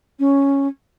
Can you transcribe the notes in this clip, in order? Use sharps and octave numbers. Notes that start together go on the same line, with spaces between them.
C#4